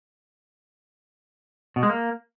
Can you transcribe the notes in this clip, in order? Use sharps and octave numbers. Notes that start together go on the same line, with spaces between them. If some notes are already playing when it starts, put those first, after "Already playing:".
B2
G#3
A#3